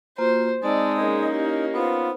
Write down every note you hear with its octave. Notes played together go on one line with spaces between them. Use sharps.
A#3 F4 F#4 C5
G#3 C4 D#4 D5 A5 E6
A#3 C#4 G#4 D#5
E4 G4 D#5
B3 D#4 F4 B4 C5